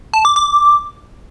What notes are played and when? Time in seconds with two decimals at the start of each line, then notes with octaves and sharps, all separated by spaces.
0.14 A5
0.25 D6
0.36 D6